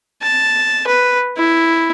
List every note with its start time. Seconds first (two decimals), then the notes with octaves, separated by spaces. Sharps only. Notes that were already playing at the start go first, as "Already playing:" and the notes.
0.22 A5
0.87 B4
1.37 E4